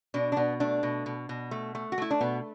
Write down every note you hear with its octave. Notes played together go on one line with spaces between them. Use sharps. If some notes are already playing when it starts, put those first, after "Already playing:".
B2 D4
D4
B2 B3
A3 D4
B2
B2
B2
A3
A3
F#4
A3 E4
D4
B2 B3